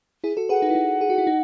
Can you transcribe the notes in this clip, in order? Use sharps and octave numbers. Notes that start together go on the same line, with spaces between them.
E4 G#4
F#4 A4
G#4 B4 F#5
D#4
E4
D#4
G#4
F#4
E4
D#4